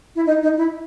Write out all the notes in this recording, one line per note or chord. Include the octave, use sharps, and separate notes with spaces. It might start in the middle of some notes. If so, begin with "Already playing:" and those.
E4
D#4
D#4
E4